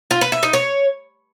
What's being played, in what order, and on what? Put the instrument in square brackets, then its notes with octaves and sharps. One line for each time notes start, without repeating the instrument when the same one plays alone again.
[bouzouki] F4
B4
E5
D#4
C#5